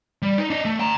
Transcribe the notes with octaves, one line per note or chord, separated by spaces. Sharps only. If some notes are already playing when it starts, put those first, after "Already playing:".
G3
D#4
D4 D#5
A3
G5 A#5